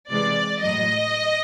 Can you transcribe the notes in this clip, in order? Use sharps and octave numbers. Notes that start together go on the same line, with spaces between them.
C3 E3 G#3 D5
A2 F#3 D#5